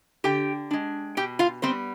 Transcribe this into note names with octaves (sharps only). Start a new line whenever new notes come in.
D3 G4 G5
G#3 D4
B2 G4 G5
F4 F5
G3 B3 C4 C5